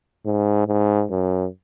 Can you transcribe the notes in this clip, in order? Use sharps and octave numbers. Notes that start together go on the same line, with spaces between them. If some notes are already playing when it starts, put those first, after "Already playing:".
G#2
G#2
F#2